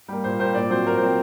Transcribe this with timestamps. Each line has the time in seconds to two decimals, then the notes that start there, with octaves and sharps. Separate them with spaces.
0.08 G3 A#3
0.24 A#2 C5
0.39 G3 A#3 C5
0.55 A#2 D5
0.70 F#3 C4 C5
0.86 A#2 A#4
0.97 C5
1.02 F#3 C4